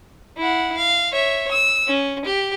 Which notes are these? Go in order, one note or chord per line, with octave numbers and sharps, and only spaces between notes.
E4 F#5
F5
C#5 E5
E6
C#4
G4